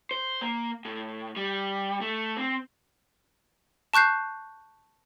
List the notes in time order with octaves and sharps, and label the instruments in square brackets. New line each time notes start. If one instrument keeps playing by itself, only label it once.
[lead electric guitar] C5
A#3
A2
G3
A3
C4
[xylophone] A5 C#6 F#6 G6 C7